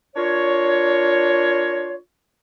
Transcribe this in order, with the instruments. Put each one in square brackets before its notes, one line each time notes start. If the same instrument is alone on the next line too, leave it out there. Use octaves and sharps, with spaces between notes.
[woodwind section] D4 F4 A#4 C#5